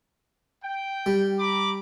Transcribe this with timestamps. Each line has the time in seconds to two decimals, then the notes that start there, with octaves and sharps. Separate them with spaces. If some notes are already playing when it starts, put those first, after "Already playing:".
0.64 G5
1.06 G3
1.39 A#5 B5 D6